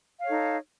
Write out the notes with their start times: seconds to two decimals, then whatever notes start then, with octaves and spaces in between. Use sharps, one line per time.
0.19 F5
0.23 C#5
0.27 A4
0.31 D#4